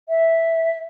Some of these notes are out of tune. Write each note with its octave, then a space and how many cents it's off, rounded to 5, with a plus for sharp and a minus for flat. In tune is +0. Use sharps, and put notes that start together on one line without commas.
E5 -5